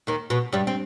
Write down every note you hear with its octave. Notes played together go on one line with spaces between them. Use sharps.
D#2 D#3
B2
G2 G3
C4